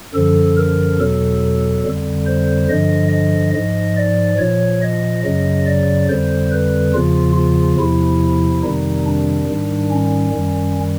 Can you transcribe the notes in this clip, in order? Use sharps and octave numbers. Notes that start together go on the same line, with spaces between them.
F#2 D3 F3 A4
A#4
E2 B2 F#3 A4
F2 D3 G3
C5
G2 D3 F3 D#5
D#5
G#2 F3 D#5
D5
A#2 F3 C#5
D#5
F#2 C#3 F#3 D#5
D5
F2 D3 G3 C5
B4
E2 C#3 F3 F4
F4
E2 C3 F3 E4
F2 C3 D#3 G3 D#4
D4
G#2 D#3 G3
C#4
F#2 D#3 G3